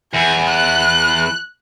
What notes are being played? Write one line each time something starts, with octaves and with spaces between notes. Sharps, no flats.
E2 G#5
F#6